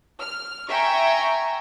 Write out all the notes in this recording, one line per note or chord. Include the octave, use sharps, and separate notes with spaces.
F6
E5 G5 G#5 A#5 C#6